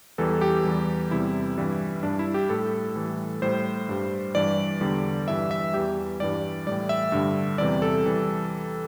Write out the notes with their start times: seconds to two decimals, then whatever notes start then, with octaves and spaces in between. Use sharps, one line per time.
0.18 E2 E3 G3 A4
0.41 G4
0.64 E2 E3 G3
1.11 E2 C3 G3 E4
1.58 G2 E3 G3
2.03 G2 G3 D4
2.19 E4
2.34 G4
2.50 A2 G3 A4
2.96 A2 E3 G3
3.42 A2 G3 C5
3.89 G2 G3
4.35 G2 E3 G3 D5
4.81 E2 D3 G3
5.28 G2 E3 G3 E5
5.51 E5
5.73 E2 E3 G3 G4
6.20 G2 E3 G3 D5
6.67 A2 E3 G3 D5
6.89 E5
7.12 G2 D3 G3
7.58 E2 C3 E3 G3 D5
7.82 A4
8.06 E3 G3